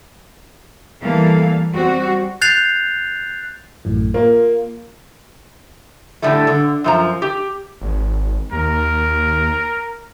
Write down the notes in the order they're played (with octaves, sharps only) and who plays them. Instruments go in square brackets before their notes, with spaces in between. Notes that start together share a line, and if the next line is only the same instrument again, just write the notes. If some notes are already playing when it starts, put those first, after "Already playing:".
[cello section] E3 G3 A#3 A4 F5
G3 C4 F#4
[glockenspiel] F#6 G6 A6 C7 F7
[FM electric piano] A1 F#2 A2
[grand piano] A#3 [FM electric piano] F4
[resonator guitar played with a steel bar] A2 D3 G3 A3
D3
F#2 F3 A#5
G4
[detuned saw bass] G#1
[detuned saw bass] D#2 [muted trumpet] A#4